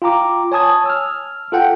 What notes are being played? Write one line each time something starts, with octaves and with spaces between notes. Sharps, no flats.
F4 G5 A#5 D6
C#5 G#5 A5 D#6 G#6
E6 F6
F4 A4 F#5 G5